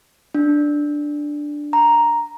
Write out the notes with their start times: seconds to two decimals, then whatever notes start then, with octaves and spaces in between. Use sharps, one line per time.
0.34 D4
1.73 A#5